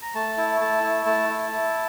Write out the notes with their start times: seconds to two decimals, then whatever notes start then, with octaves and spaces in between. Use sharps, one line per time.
0.02 A#5
0.15 A3 A5
0.37 E4
0.61 A3 A5
0.83 E4
1.06 A3 A5
1.29 E4
1.52 E4